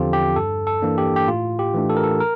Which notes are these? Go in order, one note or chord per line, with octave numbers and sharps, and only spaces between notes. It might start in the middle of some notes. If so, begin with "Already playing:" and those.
Already playing: E2 D3 F3 C4 F4 G4 A4
G4
G2 A4
A4
E3 A#3 D4
G4
G4
A2 F4
G4
E3 A3 D4
A4
A#4
A4
A#4